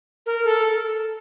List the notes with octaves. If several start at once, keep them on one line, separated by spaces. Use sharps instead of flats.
A#4
A4